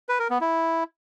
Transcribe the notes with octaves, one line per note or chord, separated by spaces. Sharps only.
B4
A#4
B3
E4